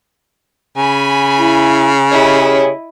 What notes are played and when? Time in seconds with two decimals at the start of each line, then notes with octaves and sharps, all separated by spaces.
0.77 C#3 G#5 B5
1.38 E4
2.11 E4 G4 G#4 C#5 D#5